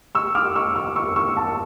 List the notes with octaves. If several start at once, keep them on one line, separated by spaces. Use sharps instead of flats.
C#6 E6
D6 F6
C#6 E6
C#6 E6
C#6 E6
C#6 E6
A5 C#6